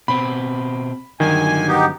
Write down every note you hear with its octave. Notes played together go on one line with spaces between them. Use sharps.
B2 C4 B5
G2 D3 D#3 F#3 G#5
B3 D#4 G4